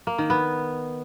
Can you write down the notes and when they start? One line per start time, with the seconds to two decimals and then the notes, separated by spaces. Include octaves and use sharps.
0.07 A#3
0.18 D#3
0.30 B3